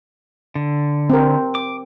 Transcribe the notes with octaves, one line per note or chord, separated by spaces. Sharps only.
D3
C4 A#4
D6